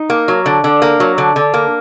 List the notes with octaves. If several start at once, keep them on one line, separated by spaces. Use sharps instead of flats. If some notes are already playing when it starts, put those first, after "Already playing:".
Already playing: D#4
A#3
F#3
D3
D3
A#3
F#3
D3
D3
A#3